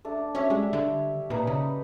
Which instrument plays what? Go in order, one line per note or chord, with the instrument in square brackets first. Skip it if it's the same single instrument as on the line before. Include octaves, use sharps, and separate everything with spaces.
[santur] A3 D4
[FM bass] C#4 [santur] F#4 C#5 E5
[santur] G3 [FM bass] G#3
[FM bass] D3
[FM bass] A#2 [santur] D#4 B4
[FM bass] C#3 [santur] D#4